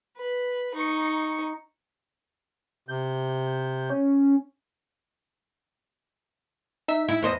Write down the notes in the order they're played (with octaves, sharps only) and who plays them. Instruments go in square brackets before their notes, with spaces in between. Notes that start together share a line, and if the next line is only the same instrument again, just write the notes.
[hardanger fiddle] B4
D#4 C#6
[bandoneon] C3 G6
[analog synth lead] C#4
[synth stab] D#4 E5 B6
[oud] E4
E2 C5 D#5